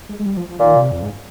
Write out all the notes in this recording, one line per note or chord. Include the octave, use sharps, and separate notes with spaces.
G#3
G#3
G3
F3
F3
A#2 D#3
C3
F2
G#2